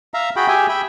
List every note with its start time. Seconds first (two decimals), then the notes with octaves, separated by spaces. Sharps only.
0.14 E5 F5 A#5
0.36 F#4 G#4 G5 B5
0.48 G4 G#4 E5 G5 G#5
0.69 E5 G5 B5